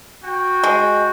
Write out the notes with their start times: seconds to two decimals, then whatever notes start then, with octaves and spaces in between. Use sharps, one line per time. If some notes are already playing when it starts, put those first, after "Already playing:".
0.23 F#4 G5
0.63 G#3